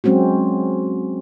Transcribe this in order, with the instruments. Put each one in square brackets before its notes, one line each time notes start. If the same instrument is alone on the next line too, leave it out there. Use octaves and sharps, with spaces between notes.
[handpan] F#3 G#3 C4 C#4 F#4